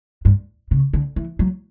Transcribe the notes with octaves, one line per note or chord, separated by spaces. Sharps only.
G2
C#3
D3
E3
F#3